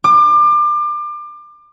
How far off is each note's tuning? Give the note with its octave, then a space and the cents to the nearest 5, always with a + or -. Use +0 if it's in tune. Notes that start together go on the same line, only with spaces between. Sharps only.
D6 +30